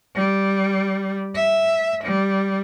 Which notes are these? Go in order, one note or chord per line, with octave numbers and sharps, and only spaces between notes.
G3
E5
G3